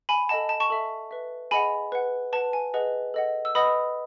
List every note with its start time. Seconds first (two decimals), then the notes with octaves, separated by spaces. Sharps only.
0.09 G#5 B5
0.29 A4 D#5 F#5 A5
0.49 A5
0.60 A5 C#6
0.70 A4 E5
1.11 B4 E5
1.51 G#4 D#5 F#5 G#5 B5
1.92 B4 F#5
2.33 B4 A5
2.36 F#5
2.53 G#5
2.74 G#4 B4 D#5 F#5
3.14 A4 D#5 F#5
3.45 E6
3.55 B4 D#5 F#5 B5 D#6